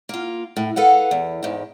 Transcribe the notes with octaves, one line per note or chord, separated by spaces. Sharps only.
A#3 F4
A2
A4 B4 F5 F#5
E2
E2 G#2